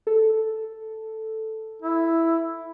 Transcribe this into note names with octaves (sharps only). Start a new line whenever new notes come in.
A4
E4